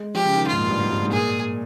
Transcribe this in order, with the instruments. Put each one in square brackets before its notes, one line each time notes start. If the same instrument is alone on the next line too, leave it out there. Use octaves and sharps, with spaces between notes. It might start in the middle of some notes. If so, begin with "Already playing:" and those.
Already playing: [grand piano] G#3
[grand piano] F3 [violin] G4
[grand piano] C#3
D#3
[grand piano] F3 [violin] F4
[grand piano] G#2
A#2
G2
G#2
G2
G#2
[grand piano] A#2 [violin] G#4